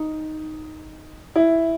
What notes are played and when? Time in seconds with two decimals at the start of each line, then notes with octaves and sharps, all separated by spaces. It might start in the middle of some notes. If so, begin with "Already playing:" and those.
Already playing: D#4
1.36 E4